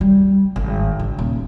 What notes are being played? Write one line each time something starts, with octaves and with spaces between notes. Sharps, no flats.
G3
G#1
D3
D#1